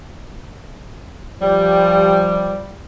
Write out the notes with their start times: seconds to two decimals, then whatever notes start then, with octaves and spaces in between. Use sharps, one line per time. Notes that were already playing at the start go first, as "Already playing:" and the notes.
1.41 F3 G3